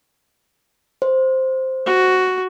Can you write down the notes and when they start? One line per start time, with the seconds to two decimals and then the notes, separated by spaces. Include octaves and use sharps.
1.02 C5
1.86 F#4